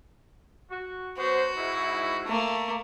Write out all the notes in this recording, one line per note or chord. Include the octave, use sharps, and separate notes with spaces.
F#4
F#3 B3 F#4 C5
G#2 E4
A3 A#3